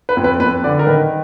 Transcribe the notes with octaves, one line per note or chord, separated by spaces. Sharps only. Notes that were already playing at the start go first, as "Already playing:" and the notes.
B4
F2
B4
F2 B4
D3 D5
A#4
D#3 B4